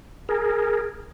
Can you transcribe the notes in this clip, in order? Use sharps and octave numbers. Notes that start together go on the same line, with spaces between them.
G#4 A#4